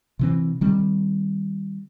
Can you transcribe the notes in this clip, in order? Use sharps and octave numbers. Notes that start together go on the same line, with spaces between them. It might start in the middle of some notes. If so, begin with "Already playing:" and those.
C3 E3 C4
D#3 G3 C4